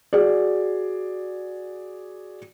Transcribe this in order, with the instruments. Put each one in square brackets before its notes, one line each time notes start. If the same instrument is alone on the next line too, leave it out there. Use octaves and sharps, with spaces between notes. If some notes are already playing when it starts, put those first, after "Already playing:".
[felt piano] F#4 G#4 D5